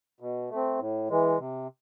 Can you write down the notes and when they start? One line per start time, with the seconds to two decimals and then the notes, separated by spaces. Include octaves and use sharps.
0.20 B2
0.50 A3
0.55 C4
0.79 A2
1.09 E3 G#3
1.38 C3